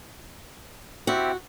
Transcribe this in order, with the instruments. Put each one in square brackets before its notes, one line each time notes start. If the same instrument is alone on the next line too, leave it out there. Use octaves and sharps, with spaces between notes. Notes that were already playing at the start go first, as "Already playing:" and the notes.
[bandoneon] C4 E4 G4 [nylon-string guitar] F#4